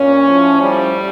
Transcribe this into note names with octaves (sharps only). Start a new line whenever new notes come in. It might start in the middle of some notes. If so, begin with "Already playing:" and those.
Already playing: A#2 C#4
A2 F3
G3